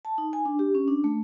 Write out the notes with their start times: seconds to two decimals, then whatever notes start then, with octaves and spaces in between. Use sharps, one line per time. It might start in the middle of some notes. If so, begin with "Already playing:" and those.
0.05 A5
0.18 D#4
0.33 G#5
0.45 D4
0.59 G4
0.75 C#4
0.88 D4
1.04 A3